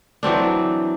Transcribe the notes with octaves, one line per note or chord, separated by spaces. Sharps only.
E3 F#3 C4 D4